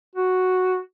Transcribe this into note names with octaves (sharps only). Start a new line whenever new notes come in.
F#4